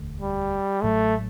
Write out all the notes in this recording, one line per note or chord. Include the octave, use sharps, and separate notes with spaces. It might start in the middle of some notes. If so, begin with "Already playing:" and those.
Already playing: E1 D2 D3 A3
G3
A1 A2 F#3 A3